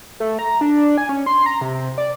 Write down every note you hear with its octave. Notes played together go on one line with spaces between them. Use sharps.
A3
A#5
D4
G#5
C#4
C6
A#5
C3
D5